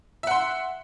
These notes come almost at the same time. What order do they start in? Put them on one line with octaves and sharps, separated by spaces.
E5 F#5 C6